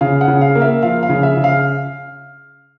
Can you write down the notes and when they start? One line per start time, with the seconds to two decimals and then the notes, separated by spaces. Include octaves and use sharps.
0.01 C#3 F5
0.21 F#5
0.28 C#3
0.41 F5
0.55 A#3
0.62 E5
0.83 F3 F5
1.03 F5
1.09 C#3
1.23 E5
1.37 C#3
1.44 F5